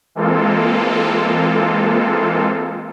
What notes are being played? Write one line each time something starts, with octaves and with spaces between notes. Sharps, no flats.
E3 G#3 A#3 C4 F4 A4